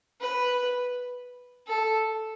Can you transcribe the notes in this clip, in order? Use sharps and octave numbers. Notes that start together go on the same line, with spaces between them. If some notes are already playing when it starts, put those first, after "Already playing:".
B4
A4